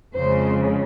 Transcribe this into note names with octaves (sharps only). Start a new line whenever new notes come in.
F2 C#3 G#3 C5